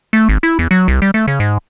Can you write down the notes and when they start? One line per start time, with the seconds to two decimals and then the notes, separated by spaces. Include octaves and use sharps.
0.13 A3
0.29 G#1
0.43 E4
0.59 E2
0.71 F#3
0.88 C2
1.02 G3
1.14 A3
1.28 C#3
1.40 G#2